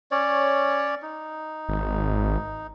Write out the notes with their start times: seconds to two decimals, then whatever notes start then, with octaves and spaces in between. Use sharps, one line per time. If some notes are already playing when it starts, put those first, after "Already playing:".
0.11 C#4 C#5 D5
1.02 D#4
1.69 G#1